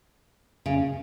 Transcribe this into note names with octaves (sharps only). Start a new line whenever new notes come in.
C#3